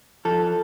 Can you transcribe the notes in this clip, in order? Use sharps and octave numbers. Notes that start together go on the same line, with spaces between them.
F3 A4